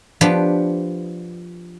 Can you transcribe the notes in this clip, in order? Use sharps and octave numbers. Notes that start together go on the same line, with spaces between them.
F3 B3 D4 G4 B4